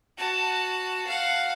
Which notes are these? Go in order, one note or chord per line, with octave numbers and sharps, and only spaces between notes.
F#4 A5
F5 F#5